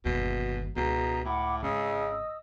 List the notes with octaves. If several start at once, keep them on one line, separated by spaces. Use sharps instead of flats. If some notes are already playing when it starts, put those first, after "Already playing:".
G1 D#2 B2
C#2 B2 G#4 A#5
A2 F#5 B5 D6
G#1 C#3 D#5 D#6 E6